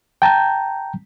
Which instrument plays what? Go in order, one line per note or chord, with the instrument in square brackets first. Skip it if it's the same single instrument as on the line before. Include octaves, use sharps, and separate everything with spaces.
[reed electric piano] G5 A5 A#5 G6